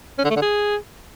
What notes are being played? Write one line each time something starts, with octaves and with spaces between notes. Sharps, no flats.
C#4
D3
A3
D3
G#4